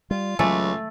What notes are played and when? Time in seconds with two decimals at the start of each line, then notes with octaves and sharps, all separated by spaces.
0.11 G3 F4
0.39 C#2 F#3 A3 G#5 A6